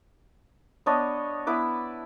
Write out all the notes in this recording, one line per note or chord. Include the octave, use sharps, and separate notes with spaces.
B3 D4 C#5 D#5
B3 E4 B4 D6